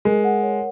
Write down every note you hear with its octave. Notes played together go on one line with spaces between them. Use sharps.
G#3 A#4
F#5
C#5